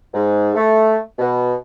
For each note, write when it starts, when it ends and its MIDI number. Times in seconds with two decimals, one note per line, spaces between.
0.14 0.50 44
0.55 0.98 57
1.19 1.55 47